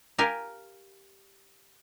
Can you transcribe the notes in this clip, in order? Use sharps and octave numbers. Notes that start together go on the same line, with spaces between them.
G4 A#4 F5 G#5